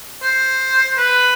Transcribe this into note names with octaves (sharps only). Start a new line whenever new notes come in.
C5
B4